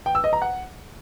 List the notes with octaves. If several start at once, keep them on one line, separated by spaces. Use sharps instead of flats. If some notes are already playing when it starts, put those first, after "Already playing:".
G5
E6
D#5
A#5
F#5